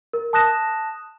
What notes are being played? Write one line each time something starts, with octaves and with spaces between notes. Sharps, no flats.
A#4
A5 D#6 F#6 A#6 E7